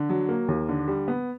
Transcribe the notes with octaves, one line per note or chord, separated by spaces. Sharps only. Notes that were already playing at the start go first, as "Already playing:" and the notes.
Already playing: D3
F#3
A#3
D#2
D3
G3
B3